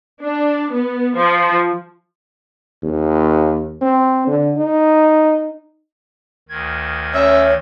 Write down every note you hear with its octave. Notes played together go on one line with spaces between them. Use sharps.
D4
B3
F3
D#2
C4
D3
D#4
D2 D#3 G#6
C#4 C#5 E5